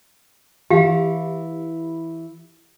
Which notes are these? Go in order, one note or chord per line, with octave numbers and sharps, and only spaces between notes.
E3 E4 G4 F5